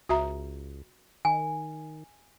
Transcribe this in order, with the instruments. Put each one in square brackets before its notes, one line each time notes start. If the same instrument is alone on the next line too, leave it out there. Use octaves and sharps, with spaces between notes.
[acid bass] C#2 [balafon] F#4 E5 A#5
[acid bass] D#3 [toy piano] G#5